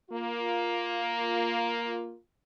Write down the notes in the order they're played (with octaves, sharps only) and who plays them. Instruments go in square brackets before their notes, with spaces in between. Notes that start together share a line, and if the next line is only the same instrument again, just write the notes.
[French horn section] A#3 F4